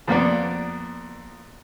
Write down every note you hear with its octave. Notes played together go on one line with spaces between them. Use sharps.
F2 A#3 B3 D5